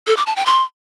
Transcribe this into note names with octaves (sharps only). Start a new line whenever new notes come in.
A4
D6
A5
G5
C6